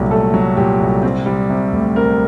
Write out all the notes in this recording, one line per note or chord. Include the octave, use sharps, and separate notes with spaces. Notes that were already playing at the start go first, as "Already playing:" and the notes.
Already playing: C2 A#2 F#3 A3 G4
A3 A4
F#3
A#2 G4
C2
C4
G3
C3
D2
C4 A#4